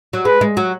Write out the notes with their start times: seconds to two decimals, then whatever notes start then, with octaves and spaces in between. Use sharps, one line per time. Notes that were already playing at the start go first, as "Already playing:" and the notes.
0.13 F#3
0.25 G#3 B4
0.41 G#3
0.57 F#3